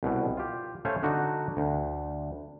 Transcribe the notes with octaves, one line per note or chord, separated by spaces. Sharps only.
C2 B2
F4 G4
A3 C#4 C5 C#5 F5 G#5
D3 D4 D#4 F#4
D2